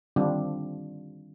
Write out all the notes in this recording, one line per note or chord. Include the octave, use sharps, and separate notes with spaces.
D3 D#3 G3 C4 D4 F4